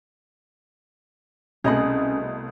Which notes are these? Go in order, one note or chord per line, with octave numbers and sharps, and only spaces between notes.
C2 B2 A3 C#4 G#4 D#5 B5